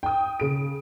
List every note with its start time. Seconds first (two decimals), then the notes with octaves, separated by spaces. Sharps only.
0.03 G5 D#6
0.40 C#3 D7